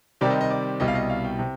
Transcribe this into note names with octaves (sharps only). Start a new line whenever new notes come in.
C3 D#3 G3 C4 D5
D#5
D#5
D5
C2 B2 G3 D#5
F5
D#5
F5
G5
C3